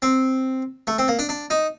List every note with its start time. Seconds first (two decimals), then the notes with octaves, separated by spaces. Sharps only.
0.02 C4
0.87 A3
0.98 C4
1.08 A#3
1.19 D4
1.29 D4
1.50 D#4